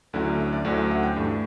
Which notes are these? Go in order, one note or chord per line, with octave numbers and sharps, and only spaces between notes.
D2 D3 F#3 C#4 E4
E5
D5
D2 D3 F#3 C#4 E4 C#5
E5
F#5
G5
G2 E3 A3